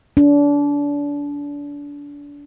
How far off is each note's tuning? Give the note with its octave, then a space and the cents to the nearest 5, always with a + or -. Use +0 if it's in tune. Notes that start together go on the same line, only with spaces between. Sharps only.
D4 -30